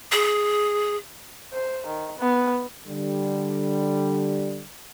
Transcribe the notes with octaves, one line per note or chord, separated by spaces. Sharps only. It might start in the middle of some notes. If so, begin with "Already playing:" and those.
G#4
C5
D#3
B3
D3 G3